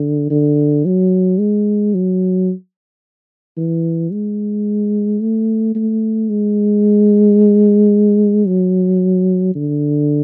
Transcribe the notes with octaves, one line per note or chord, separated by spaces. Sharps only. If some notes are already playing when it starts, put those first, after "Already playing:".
Already playing: D3
D3
F#3
G#3
F#3
E3
G#3
A3
A3
G#3
F#3
D3